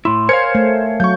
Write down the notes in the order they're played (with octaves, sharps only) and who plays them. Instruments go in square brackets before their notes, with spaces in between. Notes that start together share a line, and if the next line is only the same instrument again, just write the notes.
[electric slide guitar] A2 E4 [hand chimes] C6
[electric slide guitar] A#4 C#5 F5 [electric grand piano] C5 G#6 C#7 [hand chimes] G#5 F6
[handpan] A3
[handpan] F#3 [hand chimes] F5 [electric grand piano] C#6 G6